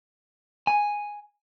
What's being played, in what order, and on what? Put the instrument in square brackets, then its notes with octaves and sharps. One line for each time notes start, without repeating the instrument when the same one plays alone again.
[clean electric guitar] G#5